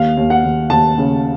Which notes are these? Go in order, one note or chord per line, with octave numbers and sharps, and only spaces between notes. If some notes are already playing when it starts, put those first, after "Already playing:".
Already playing: D#2 F5
D#2
F#5
D#2
D#2 A5
C#3